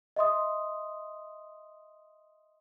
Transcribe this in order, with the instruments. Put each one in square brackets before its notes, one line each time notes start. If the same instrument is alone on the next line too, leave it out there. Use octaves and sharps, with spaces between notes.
[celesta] D#5 E5 C6 D#6